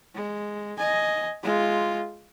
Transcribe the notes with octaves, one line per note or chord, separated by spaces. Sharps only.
G#3
D#5 G#5
G#3 F4